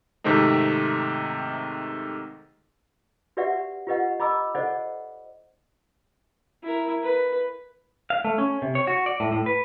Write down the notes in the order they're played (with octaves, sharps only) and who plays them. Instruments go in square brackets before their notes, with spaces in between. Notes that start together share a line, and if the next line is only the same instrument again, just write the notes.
[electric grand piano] G#2 C3 D#3 A3 C4 D#4
[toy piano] F#4 G4 B4 D5 E5 F#5
F4 G4 B4 D#5 F#5
D#5 A#5 B5 D6 E6
A4 C5 D5 D#5 F#5
[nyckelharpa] E4 A#4
B4
[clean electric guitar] F5
A3
C#4
C3
C#5
F#4
D5
A2
A2
B4